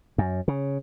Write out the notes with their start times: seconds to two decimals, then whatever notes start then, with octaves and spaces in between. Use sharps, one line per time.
0.18 F#2
0.48 C#3